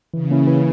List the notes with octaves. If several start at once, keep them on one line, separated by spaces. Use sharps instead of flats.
C#3 E3
A#3 C#4 E4
E3